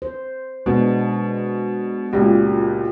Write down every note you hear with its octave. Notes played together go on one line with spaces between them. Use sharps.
C5
B2 G#3 B3 D4
C#2 A#2 A#3 F#4 G4